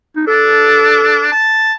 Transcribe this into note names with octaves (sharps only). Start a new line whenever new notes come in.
D#4
D4 A4
A5